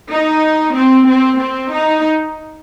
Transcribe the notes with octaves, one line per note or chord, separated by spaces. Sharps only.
D#4
C4
C4
C4
D#4